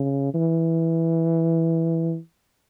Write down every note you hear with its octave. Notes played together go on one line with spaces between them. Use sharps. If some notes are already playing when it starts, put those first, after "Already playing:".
Already playing: C#3
E3